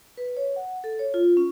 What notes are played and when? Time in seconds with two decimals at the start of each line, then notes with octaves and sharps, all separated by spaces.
0.17 B4
0.37 C#5
0.56 F#5
0.84 A4
0.99 C#5
1.14 F4
1.37 C#4